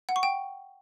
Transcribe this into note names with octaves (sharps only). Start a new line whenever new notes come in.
F#5
C#6
G5